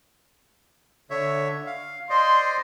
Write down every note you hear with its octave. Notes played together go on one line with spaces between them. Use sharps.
D3 C#5 E5
F5
C5 D5 D#5 C6